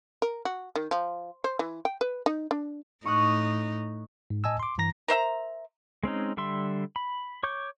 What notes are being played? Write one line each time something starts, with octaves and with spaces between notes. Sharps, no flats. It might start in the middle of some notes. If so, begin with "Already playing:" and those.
A#4
F#4
D#3
F3
C5
E3
G5
B4
D#4
D4
A2 D#4 C#6 D#6 F#6
G#2
A2 D#5 G#5 A5 E6
C6 D6
G2 E3 A#5 A#6
A#4 C5 E5 A#5
G#3 C4 C#4 D#4
D3 G3 E5 C6
B5
C#5 C#6 D6 G6